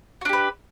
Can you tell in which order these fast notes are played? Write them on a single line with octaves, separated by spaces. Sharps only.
F#4 D4 G4 B4